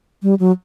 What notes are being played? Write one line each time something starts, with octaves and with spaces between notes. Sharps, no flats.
G3
F#3